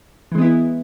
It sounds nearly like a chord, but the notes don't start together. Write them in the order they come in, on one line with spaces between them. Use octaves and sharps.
E3 G#3 B3 E4